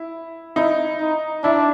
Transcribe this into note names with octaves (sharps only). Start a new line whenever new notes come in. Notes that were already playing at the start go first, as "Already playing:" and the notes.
Already playing: E4
D#4 E4
D#4
D4 E4